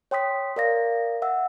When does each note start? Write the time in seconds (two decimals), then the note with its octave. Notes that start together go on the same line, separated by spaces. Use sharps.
0.11 C#5 G5 C6 D#6 B6
0.56 A#4 D5 F5 A#6
1.22 E5 F#5 E6